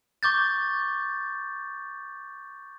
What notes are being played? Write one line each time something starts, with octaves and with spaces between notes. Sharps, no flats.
C#6 D6 G6 A6